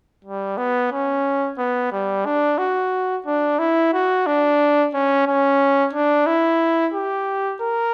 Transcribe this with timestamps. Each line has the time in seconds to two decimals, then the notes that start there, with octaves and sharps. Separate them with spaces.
0.24 G3
0.58 B3
0.92 C#4
1.58 B3
1.92 G3
2.26 D4
2.58 F#4
3.26 D4
3.59 E4
3.93 F#4
4.26 D4
4.94 C#4
5.27 C#4
5.93 D4
6.26 E4
6.94 G4
7.61 A#4